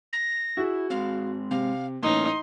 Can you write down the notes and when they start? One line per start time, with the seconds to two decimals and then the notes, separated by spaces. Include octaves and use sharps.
0.13 A#6
0.57 E4 F#4 G#4
0.90 G#2 G#3 C4 F5
1.51 C3 F5
2.03 A2 E3 A#3 C#4 D#4 C6